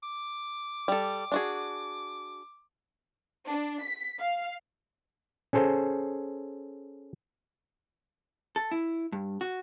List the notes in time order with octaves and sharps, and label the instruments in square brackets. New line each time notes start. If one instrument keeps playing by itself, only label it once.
[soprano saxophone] D6
[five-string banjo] G3 A4
D4 F#4 G#4
[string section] D4
B6
F5
[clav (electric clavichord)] C#4 G#4 A4 C5
[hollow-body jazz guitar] A4
E4
G2
F#4